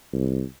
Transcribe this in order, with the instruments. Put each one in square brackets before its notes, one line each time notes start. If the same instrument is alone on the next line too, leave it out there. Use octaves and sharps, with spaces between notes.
[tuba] C2